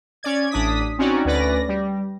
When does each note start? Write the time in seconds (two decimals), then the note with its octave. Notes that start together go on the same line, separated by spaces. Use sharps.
0.23 C#4 D5 G#6
0.51 A1 D4 D#6 B6
0.98 C4 C#4 D#4 F#4 D5
1.25 D2 C#4 B4 D5 A#6
1.68 G3